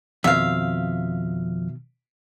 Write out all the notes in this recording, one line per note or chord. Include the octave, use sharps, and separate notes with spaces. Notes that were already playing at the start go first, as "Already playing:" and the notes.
F2 B2 D#3 E5 F5